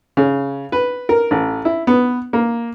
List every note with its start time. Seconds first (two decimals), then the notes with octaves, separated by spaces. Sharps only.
0.17 C#3
0.72 B4
1.09 A#4
1.31 A1
1.65 E4
1.87 B3
2.33 A#3